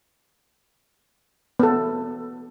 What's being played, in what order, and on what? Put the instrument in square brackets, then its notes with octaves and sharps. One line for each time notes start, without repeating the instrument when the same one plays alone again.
[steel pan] B3 A4